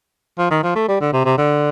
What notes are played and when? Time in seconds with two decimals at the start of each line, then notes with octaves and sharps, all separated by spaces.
0.38 F3
0.51 D#3
0.63 F3
0.75 A3
0.88 G3
1.01 D3
1.13 C3
1.26 C3
1.38 D3